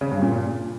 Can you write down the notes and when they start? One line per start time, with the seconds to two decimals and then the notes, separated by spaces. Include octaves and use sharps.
0.01 C#3
0.11 G2
0.22 A#2